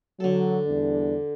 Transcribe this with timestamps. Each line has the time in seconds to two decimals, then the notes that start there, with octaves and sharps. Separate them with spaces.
0.20 D3 F#3 A4
0.67 E2 G3 D4